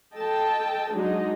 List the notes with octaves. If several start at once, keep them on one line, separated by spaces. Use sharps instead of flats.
A4 D#5 G5 A5
F#3 G#3 D4 D#4 D#5